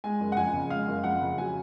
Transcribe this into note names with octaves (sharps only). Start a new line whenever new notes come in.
G#3 G#5
F#1
F#5
F2 G#5
C#3
G#3 F5
F#1
F2 F#5
C#3
F#3 G#5